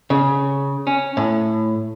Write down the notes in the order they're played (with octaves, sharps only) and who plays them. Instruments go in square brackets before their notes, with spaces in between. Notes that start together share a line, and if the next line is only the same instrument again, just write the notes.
[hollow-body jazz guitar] C#3
C#4
A2